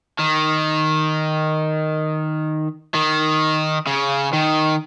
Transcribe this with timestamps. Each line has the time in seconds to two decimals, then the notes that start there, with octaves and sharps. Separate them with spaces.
0.19 D#3
2.95 D#3
3.87 C#3
4.33 D#3